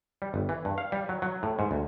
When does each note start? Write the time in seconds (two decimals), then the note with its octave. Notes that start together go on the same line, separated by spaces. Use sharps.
0.22 G3
0.34 G1
0.49 E3
0.65 G2
0.78 F5
0.92 G3
1.09 F#3
1.22 F#3
1.43 A2
1.59 G#2
1.71 D2